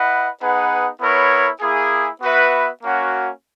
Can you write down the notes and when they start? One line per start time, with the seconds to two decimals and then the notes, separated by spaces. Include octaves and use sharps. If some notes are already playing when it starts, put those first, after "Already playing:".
Already playing: E4 B4 D#5 F#5
0.40 B3 D#4 G#4 B4 F#5
1.00 B3 E4 A#4 C#5
1.62 A#3 E4 G#4
2.21 B3 F#4 B4 E5
2.81 A#3 C#4 F#4